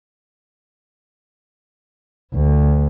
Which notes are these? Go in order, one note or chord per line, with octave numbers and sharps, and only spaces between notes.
D2